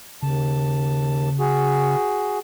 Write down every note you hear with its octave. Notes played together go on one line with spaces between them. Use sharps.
D#2 C#3 A5
F#4 G#4